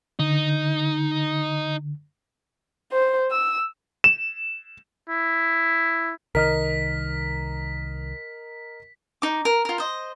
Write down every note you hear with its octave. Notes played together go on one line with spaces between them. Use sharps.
D3 D#4
C5
E6
E7
E4
C2 D#3 A#4 D#5 F6 B6
D#4 D6
A#4
F4 A#4
C5 D#5